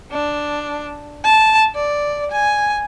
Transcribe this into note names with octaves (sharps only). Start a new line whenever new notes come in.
D4
A5
D5
G#5